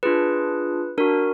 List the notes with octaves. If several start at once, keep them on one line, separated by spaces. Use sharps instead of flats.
D4 F4 G#4 B4
D4 F#4 A#4